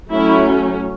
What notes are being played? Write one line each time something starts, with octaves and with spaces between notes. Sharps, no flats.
F#3 A3 C#4 E4